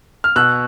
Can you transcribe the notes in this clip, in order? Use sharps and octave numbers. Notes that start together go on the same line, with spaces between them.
F6
B2 E6 F#6